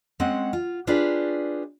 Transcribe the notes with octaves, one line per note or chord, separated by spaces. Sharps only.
G#3 C4 C#4 F#5
F4
D4 F4 G4 G#4 B4 D5